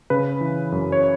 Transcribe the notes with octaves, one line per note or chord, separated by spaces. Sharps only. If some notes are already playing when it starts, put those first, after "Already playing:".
C#3 B4
E3
F#2
C#5